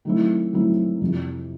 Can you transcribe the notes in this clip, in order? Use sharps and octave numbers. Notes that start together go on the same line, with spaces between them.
D#3 F#3 A3 C4 E4
D#3 F#3 A3 C4 E4
F2 C3 F3